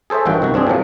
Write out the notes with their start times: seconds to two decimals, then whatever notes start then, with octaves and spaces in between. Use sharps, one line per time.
0.10 G#4 A4 C5 C#5 E5
0.26 A1 G2 D#3 F3 F#4 G5
0.42 C2 D#3 F#4
0.54 G2 C4 D4 G#4
0.67 A2 C3 F3 F#3